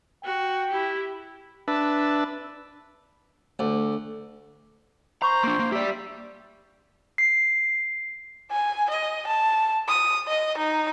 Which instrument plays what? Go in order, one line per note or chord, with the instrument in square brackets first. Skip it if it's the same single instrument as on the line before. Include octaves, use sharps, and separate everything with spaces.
[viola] F#4 [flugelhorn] G5
[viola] E4 G4
[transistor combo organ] D4 B4 E5 A5
[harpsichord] D2
[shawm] C5 [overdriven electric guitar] A#5 [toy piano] B5 C#6
[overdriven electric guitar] A#3 D4 [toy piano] C6
[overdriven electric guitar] A#3
[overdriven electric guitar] G4 D5 [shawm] E5
[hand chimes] C7
[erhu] G#5
D#5
A5
D#6
D#5
D#4